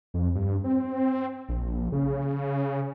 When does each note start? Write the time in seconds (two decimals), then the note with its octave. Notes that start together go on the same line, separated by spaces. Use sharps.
0.14 F2
0.35 G2
0.64 C4
1.48 A#1
1.92 C#3